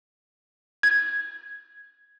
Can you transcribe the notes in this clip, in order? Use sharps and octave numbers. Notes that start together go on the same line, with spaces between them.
G#6